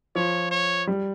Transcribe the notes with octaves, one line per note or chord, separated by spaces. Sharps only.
F3 C#5
C#5
G3